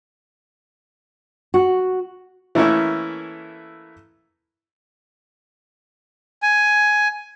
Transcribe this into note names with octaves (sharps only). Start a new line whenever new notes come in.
F#4
E3 A3 A#3 C#4 E4
G#5